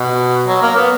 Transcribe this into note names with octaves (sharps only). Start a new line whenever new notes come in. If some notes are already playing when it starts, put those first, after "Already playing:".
Already playing: B2
F#3
A#3
B3